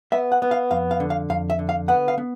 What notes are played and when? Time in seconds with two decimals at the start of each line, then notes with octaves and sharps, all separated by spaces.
0.12 B3 E5
0.32 F#5
0.42 B3
0.51 F5
0.71 F2 F5
0.91 F5
1.00 D3
1.10 F5
1.30 F2 F5
1.50 E5
1.59 D3
1.69 F5
1.88 B3 F#5
2.08 F5
2.18 B3